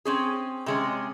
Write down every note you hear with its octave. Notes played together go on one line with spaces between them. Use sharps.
C4 C#4 G#4
C3 G#3 C#4